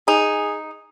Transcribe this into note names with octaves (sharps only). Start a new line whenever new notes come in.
D#4 G#4